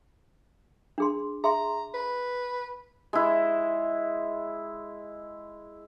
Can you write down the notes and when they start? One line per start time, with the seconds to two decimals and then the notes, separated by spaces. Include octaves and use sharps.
0.98 D4 G#4 C6
1.44 G#4 E5 A#5 C6
1.94 B4
3.13 G#3 E4